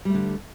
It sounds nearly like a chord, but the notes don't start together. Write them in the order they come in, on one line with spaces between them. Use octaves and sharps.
G3 A3 D3